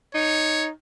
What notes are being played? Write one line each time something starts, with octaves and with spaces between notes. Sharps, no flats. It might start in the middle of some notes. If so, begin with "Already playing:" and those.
D#4 C#5